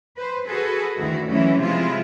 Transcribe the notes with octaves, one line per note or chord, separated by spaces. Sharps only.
B4 C5
F#4 G#4 A4 B4
D2 D#3 E3 E4 F#4
E3 F#3 G#3 A3 C#4 E4
C3 F3 G#3 E4 F4